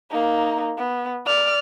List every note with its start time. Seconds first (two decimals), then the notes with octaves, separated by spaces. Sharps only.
0.10 A#3 D#4
0.78 B3
1.26 D5 F6